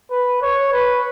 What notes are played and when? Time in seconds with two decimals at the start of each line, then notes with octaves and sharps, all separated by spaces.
0.11 B4
0.42 C#5
0.73 B4